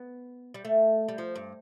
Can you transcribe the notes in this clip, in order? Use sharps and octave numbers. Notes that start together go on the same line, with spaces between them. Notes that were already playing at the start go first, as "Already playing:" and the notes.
Already playing: B3
G3
A3
G3
F3
G2